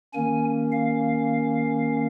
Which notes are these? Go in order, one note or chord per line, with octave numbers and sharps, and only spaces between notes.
D#3 A#3 C#4 G#5
F5